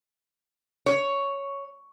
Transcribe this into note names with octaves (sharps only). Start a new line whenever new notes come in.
C#5